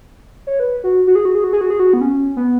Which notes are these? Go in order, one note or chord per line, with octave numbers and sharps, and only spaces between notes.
C#5
B4
F#4
F#4
G#4
F#4
G#4
F#4
G#4
F#4
G#4
F#4
B3
C#4
B3